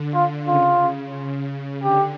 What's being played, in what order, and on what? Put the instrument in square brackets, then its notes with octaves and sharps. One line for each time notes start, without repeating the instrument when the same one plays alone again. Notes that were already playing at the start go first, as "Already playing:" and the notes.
Already playing: [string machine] D3
[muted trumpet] F4
[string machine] C#3 [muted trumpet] F4
[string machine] D3 [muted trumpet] G4